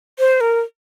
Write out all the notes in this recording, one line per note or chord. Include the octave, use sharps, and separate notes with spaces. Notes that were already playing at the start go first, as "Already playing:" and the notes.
C5
A#4